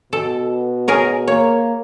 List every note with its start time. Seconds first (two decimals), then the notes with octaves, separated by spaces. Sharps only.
0.13 B2 A4
0.88 G#4 A#4 C#5
1.28 A#3 C#5